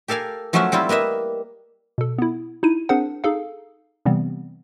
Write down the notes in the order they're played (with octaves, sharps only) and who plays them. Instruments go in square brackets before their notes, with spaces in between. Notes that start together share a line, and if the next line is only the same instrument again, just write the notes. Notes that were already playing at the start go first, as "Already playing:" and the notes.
[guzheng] G4 A4 A#4 F5 G#5
F3 F#3 A3 C#4 F#4 E5
G3 C4 E4 F4
A#3 B4 D#5 E5
[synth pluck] B2 A4
B3 E4
D#4 E4 D#7
C4 D4 G#4 A#4 C5 F#5
D#4 G#4 A4 F5
C3 E3 G3 B3 C4